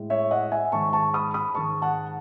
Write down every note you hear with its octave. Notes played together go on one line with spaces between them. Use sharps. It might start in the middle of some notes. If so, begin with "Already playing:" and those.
Already playing: A2 G#3
C#5 E5
D#5 F#5
E5 G#5
G#2 D#3 G#3 A5 C#6
A5 C#6
B5 D#6
B5 D#6
G#2 D#3 G#3 A5 C#6
F#5 A5